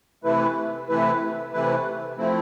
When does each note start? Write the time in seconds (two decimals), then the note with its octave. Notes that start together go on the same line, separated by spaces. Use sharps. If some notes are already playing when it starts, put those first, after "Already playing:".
0.24 C3 E3 A3 E4 B4
0.89 C3 E3 A3 E4 B4
1.53 C3 E3 A3 E4 B4
2.18 F3 A3 C4 E4